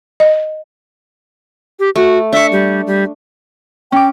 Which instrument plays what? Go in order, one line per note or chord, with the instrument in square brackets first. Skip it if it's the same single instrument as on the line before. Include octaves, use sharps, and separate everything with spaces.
[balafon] D#5
[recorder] G4
[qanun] A3 [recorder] F#4
[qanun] D4 C#6 [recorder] E5
[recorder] G3
G3
[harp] C#4 D6 [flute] G5